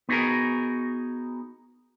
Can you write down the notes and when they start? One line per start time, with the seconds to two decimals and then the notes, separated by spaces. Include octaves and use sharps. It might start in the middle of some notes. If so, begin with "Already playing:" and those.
0.09 B3 D#4 F#4 G#4 A#4